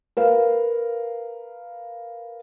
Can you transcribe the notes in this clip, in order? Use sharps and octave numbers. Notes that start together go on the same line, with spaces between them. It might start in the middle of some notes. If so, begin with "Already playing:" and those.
A#4 B4 F5